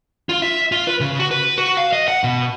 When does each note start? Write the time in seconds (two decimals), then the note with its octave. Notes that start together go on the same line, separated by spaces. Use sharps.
0.29 F4
0.42 E5
0.72 F4
0.87 B4
1.00 C#3
1.20 F#4
1.31 B4
1.58 F#4
1.77 F5
1.93 D#5
2.08 F#5
2.24 B2